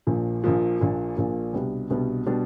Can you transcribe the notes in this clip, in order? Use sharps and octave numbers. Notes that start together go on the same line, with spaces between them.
A#1 A#2 F3
A#1 A#2 F3
A#1 A#2 F3
A#1 A#2 F3
C2 B2 G3 B3 D4
C2 B2 G3 B3 D4
B2 G3 B3 D4